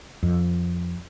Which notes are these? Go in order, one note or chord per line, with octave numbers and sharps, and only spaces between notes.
F2